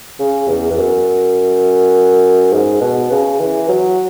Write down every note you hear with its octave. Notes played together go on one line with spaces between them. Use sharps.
C#3
E2
E2
F#2
G#2
B2
C#3
E3
F#3